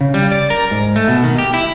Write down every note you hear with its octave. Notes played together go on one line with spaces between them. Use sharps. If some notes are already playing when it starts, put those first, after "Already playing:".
C#3
G3
D5
A#4
G#2
A3
B2
D#3
G4
E4